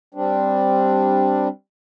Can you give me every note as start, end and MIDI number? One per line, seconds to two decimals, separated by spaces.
0.15 1.48 55
0.15 1.48 60
0.15 1.48 62